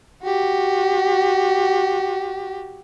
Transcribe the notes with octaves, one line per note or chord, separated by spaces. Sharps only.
F#4 G4